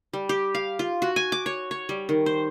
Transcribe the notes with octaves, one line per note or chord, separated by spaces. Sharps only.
G3
G4
F5
F4
F#4
G#5
D6
C#5
C#5
G3
D#3
C5